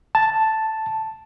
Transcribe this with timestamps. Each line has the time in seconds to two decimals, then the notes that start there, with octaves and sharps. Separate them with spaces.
0.15 A5